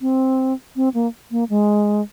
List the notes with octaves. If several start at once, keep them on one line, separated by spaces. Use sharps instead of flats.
C4
C4
A#3
A#3
G#3